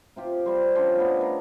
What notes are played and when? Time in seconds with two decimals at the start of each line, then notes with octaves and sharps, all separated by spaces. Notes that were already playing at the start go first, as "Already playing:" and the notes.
0.16 C3 F4 G4
0.46 G3 C5
0.75 C#4 D4 F4 C5
0.96 A3 B3
1.21 A#4